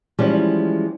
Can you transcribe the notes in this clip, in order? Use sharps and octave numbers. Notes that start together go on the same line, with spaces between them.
E3 F3 G3 G#3 C#4